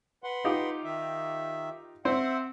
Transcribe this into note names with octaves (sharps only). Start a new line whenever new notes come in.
B4 F#5 C6
D#4 F4 G4
D#3 E5
C4 C5 E5 F#5